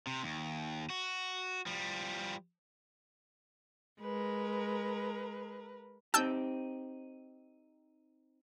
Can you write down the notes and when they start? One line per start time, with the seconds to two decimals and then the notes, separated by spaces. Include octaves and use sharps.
0.07 C3
0.23 D#2
0.90 F#4
1.66 F3 G3
4.00 G#3 A#4 B4
6.14 C4 D#4 G4 A5 E6 G6